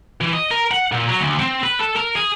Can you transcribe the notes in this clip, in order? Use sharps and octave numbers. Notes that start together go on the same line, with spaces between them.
E3
D#5
A#4
F#5
A#2
F#3
D2
C4
B4
A4
A#4
G#4